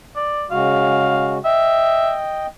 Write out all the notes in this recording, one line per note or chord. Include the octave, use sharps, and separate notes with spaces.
D5
C#3 G#3 F#4 F5
D#5 E5 G5